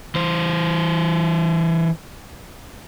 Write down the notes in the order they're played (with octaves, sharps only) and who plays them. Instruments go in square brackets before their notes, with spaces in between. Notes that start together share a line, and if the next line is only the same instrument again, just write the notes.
[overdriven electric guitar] E3 C5